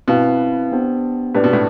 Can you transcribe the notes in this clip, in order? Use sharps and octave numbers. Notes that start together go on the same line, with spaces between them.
B2 C4 E4 B4 F5 A5
B3 D4 G4 C5 G5
A2 D4 G4 B4 D5
B2
A2